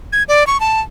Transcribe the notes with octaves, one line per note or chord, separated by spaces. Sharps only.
G#6
D5
C#6
A5